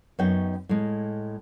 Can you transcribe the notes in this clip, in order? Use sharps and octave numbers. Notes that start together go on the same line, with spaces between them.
F#2 B3 C#4 D#4 G5
A2 G#3